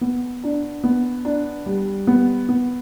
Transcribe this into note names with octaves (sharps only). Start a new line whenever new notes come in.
B3
D4
B3
D4
G3
B3
B3